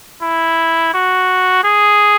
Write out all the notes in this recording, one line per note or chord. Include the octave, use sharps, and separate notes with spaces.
E4
F#4
G#4